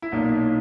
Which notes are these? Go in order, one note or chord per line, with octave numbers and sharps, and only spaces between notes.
E4
B1 A#2 A#3 D#4